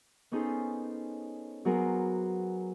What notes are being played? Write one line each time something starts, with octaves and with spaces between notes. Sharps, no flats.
B3 C#4 D#4 G#4 A4 C5
F#3 B3 G#4 A#4 C5